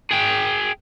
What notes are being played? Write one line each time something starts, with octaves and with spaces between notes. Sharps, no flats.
G#4 G5